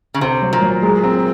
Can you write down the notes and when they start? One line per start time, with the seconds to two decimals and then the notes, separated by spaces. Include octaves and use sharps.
0.14 C#3
0.21 C3 C5
0.42 F#3
0.53 A#2
0.62 F#3
0.82 G#3
1.04 C4